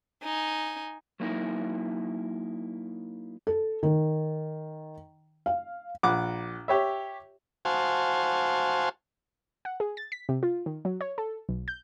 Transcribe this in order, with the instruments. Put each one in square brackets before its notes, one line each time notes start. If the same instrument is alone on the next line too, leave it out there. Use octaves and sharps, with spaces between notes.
[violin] D#4 G#5
[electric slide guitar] F#3 A#3 C#4 D#4 E4
[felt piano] A4
D#3
F5
[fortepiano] A#1 F#5 D6
G4 C#5 E5
[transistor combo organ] F#4 C5 F5 G#5 A5
[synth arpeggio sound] F#5
G#4
A6
B6
C3
F4
D#3
F#3
C#5
A4
B1
G6